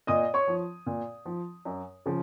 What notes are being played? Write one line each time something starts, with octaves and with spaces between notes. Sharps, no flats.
A#2 D#5 D#6
C#5 C#6
F3
A#2
F3
F#2
C#3 F3